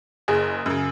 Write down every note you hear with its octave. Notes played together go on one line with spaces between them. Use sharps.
F#1 G#4
F#2 C#3